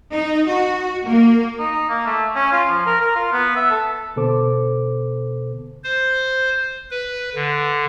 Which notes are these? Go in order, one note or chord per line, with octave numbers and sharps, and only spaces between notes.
D#4
F#4
A#3
D#4
A#3
A3
C#4
F4
F3
A#4
A#4
F4
B3
E5
A4
B2 D3 B3 A4 C5 D6
C5
B4
D3